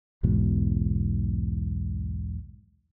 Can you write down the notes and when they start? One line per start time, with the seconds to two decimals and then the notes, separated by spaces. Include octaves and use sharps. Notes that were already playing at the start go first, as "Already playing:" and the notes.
0.23 B1 E2 G#2 B2